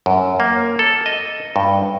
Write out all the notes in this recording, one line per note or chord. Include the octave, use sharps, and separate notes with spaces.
F#2
A#3
A4
D#5
G2